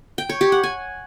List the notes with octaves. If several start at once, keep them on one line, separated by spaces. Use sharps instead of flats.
G5
C#5
G4
F#5
G#5